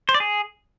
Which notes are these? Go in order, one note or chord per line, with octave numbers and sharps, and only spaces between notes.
C5
D5
G#4